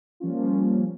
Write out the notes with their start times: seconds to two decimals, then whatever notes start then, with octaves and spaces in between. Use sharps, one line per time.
0.20 F3 G3 A#3 C#4 F4